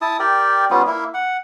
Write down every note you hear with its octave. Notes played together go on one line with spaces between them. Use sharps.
E4 A5 D#6
G4 A#4 D5 G5
G3 B3 C#4 F4
A#3 E4
F#5